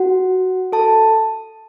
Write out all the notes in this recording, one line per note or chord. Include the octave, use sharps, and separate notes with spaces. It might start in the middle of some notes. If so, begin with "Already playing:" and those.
Already playing: F#4 F#5
A4 A5